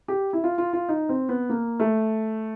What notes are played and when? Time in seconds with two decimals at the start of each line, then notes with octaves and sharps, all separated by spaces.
0.08 G4
0.33 E4
0.44 F4
0.58 F4
0.73 F4
0.89 D#4
1.09 C4
1.29 B3
1.49 A#3
1.80 A3